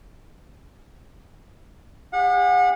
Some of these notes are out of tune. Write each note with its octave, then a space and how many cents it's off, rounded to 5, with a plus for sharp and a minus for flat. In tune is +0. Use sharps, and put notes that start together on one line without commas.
G4 +45 F#5 -35